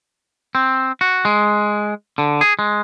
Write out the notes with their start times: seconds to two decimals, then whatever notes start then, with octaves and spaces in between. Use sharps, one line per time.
0.55 C4
1.01 F#4
1.25 G#3
2.18 D3
2.41 G#4
2.59 G#3